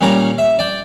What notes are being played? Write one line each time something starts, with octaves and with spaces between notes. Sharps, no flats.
A#2 G3 C#4 A#5 D6
E5
D5 G5